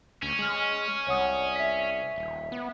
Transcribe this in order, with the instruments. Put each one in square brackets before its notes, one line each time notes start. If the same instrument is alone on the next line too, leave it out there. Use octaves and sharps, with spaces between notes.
[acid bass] D2 [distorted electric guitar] C#4
[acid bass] G#3 [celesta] F6 F#7
[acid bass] C2 [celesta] C#5 F#5 D#6
[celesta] E5 B6
[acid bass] D#1
B3